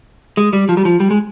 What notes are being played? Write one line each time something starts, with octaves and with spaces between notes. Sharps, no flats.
G#3
G3
F3
G3
F3
G3
G#3